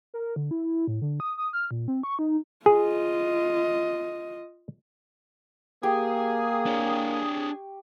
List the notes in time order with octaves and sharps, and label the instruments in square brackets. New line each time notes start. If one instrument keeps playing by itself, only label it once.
[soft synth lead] A#4
D3
E4
A2
D3
D#6
D#6
F6
A#2
C4
C#6
D#4
[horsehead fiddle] F4 D#5 [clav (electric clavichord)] G#4
[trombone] A#3 [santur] G4 [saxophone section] G#4
[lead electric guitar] D4 C#5 [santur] C#6